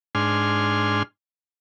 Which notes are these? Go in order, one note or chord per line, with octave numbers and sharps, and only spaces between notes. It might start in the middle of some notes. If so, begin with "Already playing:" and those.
G#2 D4 G#5 C6 F6